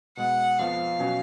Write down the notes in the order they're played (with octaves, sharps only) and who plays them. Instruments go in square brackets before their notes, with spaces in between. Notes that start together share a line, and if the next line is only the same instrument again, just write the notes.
[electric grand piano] B2 G#3 B3 [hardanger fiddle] F#5
[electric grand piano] F2 F3 B3 [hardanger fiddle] F5
[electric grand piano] B2 F#3 C#4 F#4